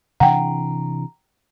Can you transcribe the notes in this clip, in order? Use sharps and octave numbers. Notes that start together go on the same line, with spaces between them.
C3 E3 D4 F#5 G5 A#5